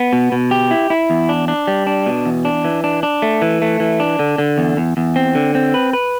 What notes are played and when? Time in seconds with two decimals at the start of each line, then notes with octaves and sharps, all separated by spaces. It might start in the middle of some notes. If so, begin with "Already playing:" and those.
Already playing: B3
0.13 B2
0.32 B2
0.51 G4
0.71 E4
0.90 E4
1.10 E2
1.29 D4
1.48 D4
1.67 G3
1.87 D4
2.06 B2
2.26 E2
2.45 D4
2.65 E3
2.84 D4
3.03 D4
3.22 A3
3.42 E3
3.62 A3
3.80 E3
4.00 D4
4.19 D3
4.38 D3
4.58 E2
4.77 E2
4.97 E2
5.16 C4
5.35 D3
5.55 C4
5.74 B4
5.93 B4